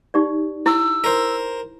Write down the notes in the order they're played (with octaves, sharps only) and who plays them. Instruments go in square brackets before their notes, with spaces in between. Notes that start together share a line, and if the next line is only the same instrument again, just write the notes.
[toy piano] D#4 G4 D5
[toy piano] E4 [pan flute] E6
[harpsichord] A#4 C5